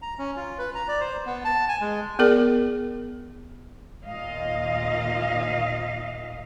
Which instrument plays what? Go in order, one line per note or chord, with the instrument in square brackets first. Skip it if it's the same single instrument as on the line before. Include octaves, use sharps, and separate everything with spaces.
[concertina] A#5
C#4
F4
B4
A#5
D5
C5
B3
A5
G#5
G#3
[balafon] B3 G#4 A#4 D5
[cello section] D#2 A#2 D#5 F5